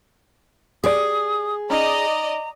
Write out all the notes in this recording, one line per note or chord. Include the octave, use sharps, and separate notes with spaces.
G4 G#4 D5 D#6
C#4 D#4 D5 D#5 A#5